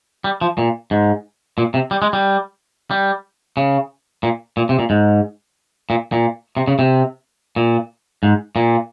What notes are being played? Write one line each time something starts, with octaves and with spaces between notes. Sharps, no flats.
G3
F3
A#2
G#2
A#2
C3
G3
G#3
G3
G3
C#3
A#2
A#2
C3
A#2
G#2
A#2
A#2
C3
C#3
C3
A#2
G#2
A#2